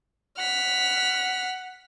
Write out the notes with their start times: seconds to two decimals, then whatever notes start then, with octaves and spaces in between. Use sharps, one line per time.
0.38 F#5 F6 B6